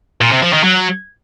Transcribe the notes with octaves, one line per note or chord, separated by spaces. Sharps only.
A#2
C3
F3
D#3
F#3